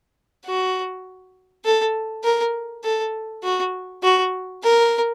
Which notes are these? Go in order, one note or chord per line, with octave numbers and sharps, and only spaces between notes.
F#4
A4
A#4
A4
F#4
F#4
A#4